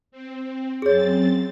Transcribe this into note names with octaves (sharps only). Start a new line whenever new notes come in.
C4
F#2 C4 G#4 C#5 A6